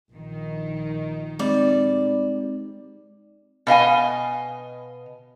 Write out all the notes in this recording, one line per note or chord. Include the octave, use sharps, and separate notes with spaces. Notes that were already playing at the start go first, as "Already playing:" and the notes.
A#1 D#3
G3 G#3 C4 D#4 D5
B2 D#5 F5 G#5